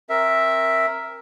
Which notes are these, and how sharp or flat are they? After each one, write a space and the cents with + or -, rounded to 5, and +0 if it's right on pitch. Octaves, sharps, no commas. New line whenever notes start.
C4 +35 A#4 +0 E5 +0